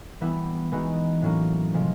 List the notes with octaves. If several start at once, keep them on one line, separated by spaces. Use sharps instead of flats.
E3 G3 B3 E4
E3 G#3 B3 D#4 F#4
A2 F#3 A#3 C#4
C3 F3 G#3